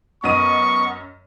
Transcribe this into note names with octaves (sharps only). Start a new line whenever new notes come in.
F#2 B3 D#5 C#6 D#7